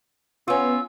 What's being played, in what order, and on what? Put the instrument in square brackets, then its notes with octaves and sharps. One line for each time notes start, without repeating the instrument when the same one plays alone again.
[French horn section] B3 [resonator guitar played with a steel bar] C#4 F4 [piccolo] E6